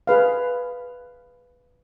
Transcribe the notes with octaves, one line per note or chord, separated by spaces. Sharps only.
G#4 B4 F5